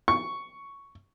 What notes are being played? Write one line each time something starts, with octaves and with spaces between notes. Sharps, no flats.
C#6